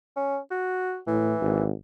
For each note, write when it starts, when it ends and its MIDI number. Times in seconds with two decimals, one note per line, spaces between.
0.17 0.38 61
0.51 0.99 66
1.07 1.34 45
1.07 1.64 52
1.41 1.72 32